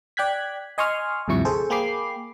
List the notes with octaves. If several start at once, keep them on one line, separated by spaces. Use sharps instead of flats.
D5 G5 F#6 G#6 B6
D#5 G#5 C6 C#6 D#6 F6
D2 G2 C3 F3 E4 C#6
G#4 A4 C5
A#3 G#4 G5 B5 D6 C7